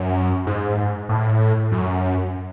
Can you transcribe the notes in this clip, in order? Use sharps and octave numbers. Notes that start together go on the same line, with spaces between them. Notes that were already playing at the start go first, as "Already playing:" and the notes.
Already playing: F#2
G#2
A2
F#2